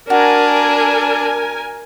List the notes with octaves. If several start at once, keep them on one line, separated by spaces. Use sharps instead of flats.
D4 F#4 A#4 G#5